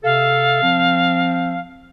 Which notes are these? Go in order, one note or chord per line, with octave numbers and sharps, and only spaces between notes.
C3 A4 F5
F3 C4